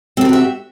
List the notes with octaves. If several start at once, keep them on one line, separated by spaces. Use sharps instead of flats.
C4 F#4 G4 A4 E5